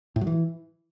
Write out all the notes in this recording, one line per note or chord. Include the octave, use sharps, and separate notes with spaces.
A2
F#3
E3